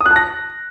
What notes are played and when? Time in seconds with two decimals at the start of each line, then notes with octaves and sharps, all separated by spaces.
0.01 D#6
0.06 F#6
0.11 A5
0.16 A#6